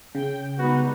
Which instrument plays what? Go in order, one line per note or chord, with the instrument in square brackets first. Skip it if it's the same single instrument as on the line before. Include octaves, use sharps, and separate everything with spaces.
[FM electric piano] C#3 [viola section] G5
[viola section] G3 G#3 D#4 [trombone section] B3 B4 [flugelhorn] F#4